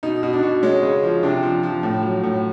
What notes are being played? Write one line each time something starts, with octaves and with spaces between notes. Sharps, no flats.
B2 D#4
B2
D4
B2
G#3 C#4
C#3
F3
C3 D4
F3
F3
A2
F#3
A2